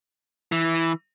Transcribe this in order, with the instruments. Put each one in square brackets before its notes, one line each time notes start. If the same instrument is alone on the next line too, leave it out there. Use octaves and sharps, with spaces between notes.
[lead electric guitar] E3